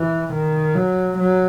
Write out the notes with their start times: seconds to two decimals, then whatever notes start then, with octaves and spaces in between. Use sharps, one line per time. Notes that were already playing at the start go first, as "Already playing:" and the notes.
Already playing: E3
0.33 D#3
0.75 F#3
1.18 F#3